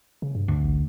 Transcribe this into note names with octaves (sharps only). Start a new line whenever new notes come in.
C#3
G2
D2
A1